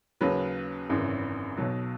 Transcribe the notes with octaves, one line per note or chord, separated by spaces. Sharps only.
D#2 C#3 F#3 B4
G#1 F#2 C#3 E3
B1 B2 F#3